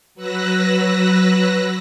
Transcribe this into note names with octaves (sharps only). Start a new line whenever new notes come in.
F#3 B4 E6 F#6 A#6